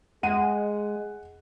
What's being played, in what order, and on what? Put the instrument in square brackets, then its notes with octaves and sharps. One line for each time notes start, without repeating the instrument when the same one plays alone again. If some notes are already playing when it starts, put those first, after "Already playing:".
[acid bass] G#3 [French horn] G#4 [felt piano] F#5 D#7